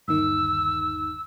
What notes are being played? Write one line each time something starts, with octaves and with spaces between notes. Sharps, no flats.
G1 D#2 D#3 E6